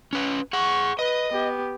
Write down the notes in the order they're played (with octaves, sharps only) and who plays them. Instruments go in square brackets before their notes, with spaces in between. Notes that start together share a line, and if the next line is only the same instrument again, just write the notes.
[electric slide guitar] C#4 B4
[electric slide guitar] G#4 F#5 [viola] C#6
[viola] B4 [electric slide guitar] D#5
[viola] B3 G4